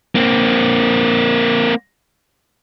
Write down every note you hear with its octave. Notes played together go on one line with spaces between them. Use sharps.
A#3 C4